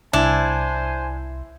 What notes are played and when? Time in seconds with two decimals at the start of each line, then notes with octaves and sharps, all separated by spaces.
0.13 C2 D4 E4 C5 G#5